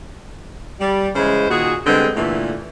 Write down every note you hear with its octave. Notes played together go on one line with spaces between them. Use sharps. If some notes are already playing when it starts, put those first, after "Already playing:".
G3
C#3 E3 G#3 E4 C5
A#2 D#3 F#4 G#4
D3 G3 G#3 B3 C4
A#2 D3 E3 A3